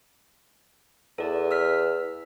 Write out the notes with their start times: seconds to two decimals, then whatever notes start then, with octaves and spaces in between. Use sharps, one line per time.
1.18 E2 A4 D5
1.51 E6 F6 B6